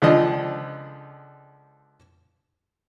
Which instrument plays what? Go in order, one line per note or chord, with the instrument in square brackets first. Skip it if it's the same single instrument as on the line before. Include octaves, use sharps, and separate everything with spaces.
[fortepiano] C#2 D3 F3 D#5